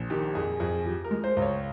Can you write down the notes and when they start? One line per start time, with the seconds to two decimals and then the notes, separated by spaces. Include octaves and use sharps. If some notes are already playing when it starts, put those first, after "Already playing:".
Already playing: A#1
0.10 D#3 G4
0.35 F2 G#4
0.60 F2 G#4
0.86 F3 G4
1.04 A#4
1.11 G#3
1.24 C5
1.37 C#2
1.42 C#5